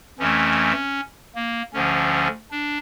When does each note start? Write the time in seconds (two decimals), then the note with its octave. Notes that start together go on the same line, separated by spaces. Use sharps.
0.19 F2 E3 A3 C#4
1.35 A#3
1.73 D2 D3 F3 C#4
2.51 D4